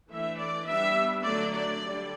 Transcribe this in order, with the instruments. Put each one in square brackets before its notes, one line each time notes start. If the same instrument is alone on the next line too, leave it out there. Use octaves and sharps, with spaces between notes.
[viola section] E3 A3 D4 E5
D5
G3 B3 D4 E5
D3 F#3 A3 D4 D5
D5
D3 G3 D4